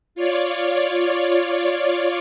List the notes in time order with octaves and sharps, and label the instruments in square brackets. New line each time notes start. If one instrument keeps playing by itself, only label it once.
[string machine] F4 C#5 D5